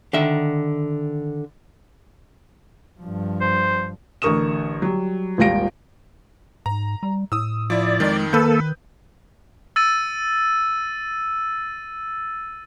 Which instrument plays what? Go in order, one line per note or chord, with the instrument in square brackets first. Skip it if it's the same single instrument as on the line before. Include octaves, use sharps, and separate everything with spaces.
[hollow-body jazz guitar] D3 D#3 E5
[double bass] G2 F3
[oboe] C5
[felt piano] A1 D3 A#4 C#6 D#6 E7
F#3 G3
D#1 G#1 G3 F4 A#6 D7
[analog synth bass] G#2 [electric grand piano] A#5
[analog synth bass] G3
[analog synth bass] A2 [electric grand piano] D#6 E6
[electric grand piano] F3 E4 [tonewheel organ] D5
[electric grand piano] F2 D#3 [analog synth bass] G#3
[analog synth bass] D#3 [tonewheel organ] A#3 A4 [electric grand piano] B4 G6
[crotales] E6 A6 D#7